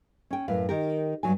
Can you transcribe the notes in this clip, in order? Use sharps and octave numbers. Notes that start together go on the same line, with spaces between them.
C#4 G5
F#2 A2 B4 F5
D#3 G4 A#4
G2 F#3 G#5